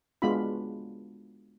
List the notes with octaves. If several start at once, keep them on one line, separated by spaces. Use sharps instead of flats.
G#3 B3 D4 F4 F#4 B5